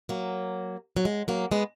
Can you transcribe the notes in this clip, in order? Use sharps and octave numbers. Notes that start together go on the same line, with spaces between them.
F#3 A#3
F#3
G#3
F#3 A#3
G#3 B3